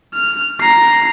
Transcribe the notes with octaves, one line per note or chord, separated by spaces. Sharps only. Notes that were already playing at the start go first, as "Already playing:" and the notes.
F6
A#5 C7